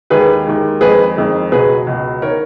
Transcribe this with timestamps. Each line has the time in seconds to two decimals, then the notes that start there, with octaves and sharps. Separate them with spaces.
0.10 D#2 D#3 G#3 G#4 B4
0.46 D#2 D#3 G#3
0.81 F2 D#3 G#3 G#4 B4
1.17 F2 D#3 G#3
1.52 C#2 B2 F#3 G#4 B4
1.87 C#2 B2 F#3
2.22 D#3 A#4 C#5